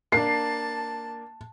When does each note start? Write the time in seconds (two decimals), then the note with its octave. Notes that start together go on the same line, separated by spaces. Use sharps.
0.12 A#3 D4 A5 C7